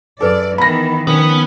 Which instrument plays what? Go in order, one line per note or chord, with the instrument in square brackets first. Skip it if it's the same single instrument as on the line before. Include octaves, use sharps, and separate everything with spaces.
[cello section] F#2 D5 [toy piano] G#4 B4 [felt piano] A4
[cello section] D#3 E3 B3 [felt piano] B5 A#6
[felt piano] D#3 [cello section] F3 C#4 [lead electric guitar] B3